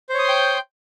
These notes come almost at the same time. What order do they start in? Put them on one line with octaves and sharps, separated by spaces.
C5 C#5 D#6 C6 G5